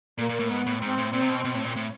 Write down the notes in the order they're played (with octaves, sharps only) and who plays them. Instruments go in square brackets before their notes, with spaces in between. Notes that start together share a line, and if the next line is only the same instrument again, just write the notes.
[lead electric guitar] A#2 [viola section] A#3
[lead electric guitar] A#2
A2
[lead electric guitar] G#2 [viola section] B3
[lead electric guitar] A2
[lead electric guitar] G#2 [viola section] C4
[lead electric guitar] A2
[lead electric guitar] A#2 [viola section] C4
[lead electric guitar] C3
B2
B2
A2
A#2
A2